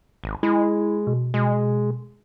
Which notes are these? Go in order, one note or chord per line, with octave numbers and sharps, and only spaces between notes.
G#1
G#3 E4
B2
B2 G#3